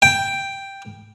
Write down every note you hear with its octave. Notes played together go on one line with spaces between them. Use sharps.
G5